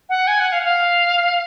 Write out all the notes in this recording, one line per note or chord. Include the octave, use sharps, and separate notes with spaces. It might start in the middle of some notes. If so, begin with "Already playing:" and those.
F#5
G#5
F#5
F5
F#5
F5